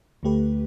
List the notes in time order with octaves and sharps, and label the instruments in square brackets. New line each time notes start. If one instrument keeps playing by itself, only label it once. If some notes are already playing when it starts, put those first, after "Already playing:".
[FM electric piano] D2 D3 A3 G4 B4